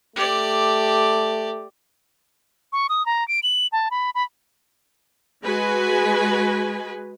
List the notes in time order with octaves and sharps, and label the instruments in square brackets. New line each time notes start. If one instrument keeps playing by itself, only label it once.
[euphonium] A3 [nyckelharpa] G4 D5
[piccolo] C#6
D#6
A#5
D7
F#7
A5
B5
B5
[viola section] G#3 F#4 B4 G#5